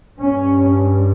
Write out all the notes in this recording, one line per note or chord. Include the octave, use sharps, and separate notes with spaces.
G2 C#4